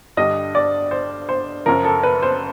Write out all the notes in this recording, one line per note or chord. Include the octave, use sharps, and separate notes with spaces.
G2 D3 G3 D#5
D5
C5
C5
F#2 C#3 F3 A#4
A4
B4
C5